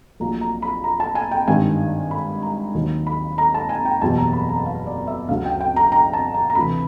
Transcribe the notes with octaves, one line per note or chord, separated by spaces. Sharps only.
A#1 A#2 F#3 A3 A#5
A#5
B5
A#5
A5
G#5
G5
G#1 G2 D#3 G3 G#5
B5
A#5
D#2 D#3 F#3
B5
A#5
A5
G#5
G5
F#1 E2 B2 G3 A5
A#5
B5
A#5
F5
D5
E5
D2 C#3 F#3 F5
G5
G5
A#5
A#5
A5
A#5
A#5
D2 C3 E3 B5